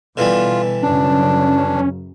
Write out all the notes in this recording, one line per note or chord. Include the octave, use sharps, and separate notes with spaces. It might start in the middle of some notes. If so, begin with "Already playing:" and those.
B2 D3 E3 G3 F4
F#2 C#3 C#4 D4